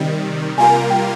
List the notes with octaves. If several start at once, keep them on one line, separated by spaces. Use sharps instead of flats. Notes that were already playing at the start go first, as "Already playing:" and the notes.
Already playing: C3 D#3 G3
C3 G3 A#3 F4 A#4 G#5
G5